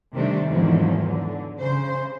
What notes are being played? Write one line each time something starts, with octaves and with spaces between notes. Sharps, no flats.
C3 D#3 G3 A3 D4
E2 G#2 D3 D#3 F3 F#3
D3
C#3 C5